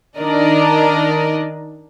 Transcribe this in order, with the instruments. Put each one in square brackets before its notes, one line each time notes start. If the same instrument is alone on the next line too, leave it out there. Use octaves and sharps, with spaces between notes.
[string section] D#3 D4 A#4 D5 D#5